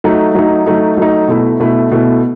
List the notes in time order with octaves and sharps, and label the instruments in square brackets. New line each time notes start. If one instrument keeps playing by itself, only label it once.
[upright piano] F#3 A3 D#4
F#3 A3 D#4
F#3 A3 D#4
F#3 A3 D#4
B2 A3 E4
B2 A3 E4
B2 A3 E4